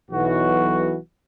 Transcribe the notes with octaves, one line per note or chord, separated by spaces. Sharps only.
B1 E3 F#4